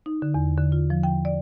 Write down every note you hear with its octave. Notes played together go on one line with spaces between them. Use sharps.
D#4
D3
E2
D3
F4
F3
G5
D5